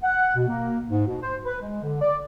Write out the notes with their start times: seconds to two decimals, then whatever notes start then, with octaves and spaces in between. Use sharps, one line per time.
0.03 F#5
0.36 B2
0.48 A#3
0.88 G#2
1.07 B2
1.22 C5
1.45 B4
1.61 G#3
1.82 D3
2.01 D5